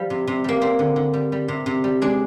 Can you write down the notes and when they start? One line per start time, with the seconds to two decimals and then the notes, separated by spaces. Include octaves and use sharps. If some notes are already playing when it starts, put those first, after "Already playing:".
Already playing: F3 G3 F4
0.10 C3
0.27 C3
0.44 G3 A#3
0.61 G3 C4
0.79 D3
0.96 D3
1.13 G3
1.32 G3
1.48 C3
1.66 C3
1.84 G3
2.02 G#3 D4